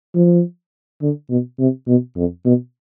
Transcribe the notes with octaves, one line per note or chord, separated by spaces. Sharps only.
F3
D3
B2
C3
B2
F2
B2